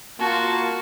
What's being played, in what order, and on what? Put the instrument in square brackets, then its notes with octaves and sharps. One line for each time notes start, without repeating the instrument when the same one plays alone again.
[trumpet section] A#3 F4 A5 [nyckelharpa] F#4